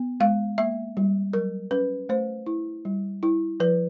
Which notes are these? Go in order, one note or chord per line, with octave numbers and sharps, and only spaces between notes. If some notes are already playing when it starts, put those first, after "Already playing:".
Already playing: B3
G#3 F5
A#3 E5
G3
F#3 A#4
C#4 B4
A3 C5
E4
G3
E4
F3 B4